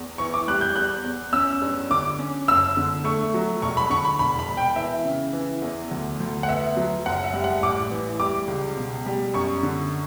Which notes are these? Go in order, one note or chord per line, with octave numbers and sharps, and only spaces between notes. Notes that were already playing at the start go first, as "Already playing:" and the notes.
Already playing: E2
E3 C#6
D6
G3 F#6
G6
E2 F#6
E2
C#4 E6
G2
D3 D6
C#4
F#1 E6
D3
A3 C#6
F#3
E1 C#6
B5
D3 C#6
B5
E1 B5
B5
E1
G5
E3 E5
C#3
E3
E2
D2
D2
F#5
B3 E5
F#3
F#1 F#5
E5
G3
F#5
A1 D6
E3
G3 D6
C#2
B2
G3
F#2 C#6
D3